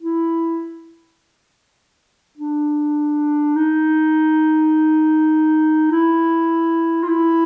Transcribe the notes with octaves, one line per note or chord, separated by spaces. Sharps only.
E4
D4
D#4
E4
F4
E4